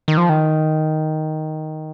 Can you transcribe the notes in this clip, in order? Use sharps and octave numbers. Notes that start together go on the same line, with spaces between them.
D#3
F3
D#3